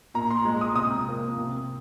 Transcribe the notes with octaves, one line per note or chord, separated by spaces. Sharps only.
A#2 A#5
C6
G#3
D#6
C3 D#6
F3 A#3
C3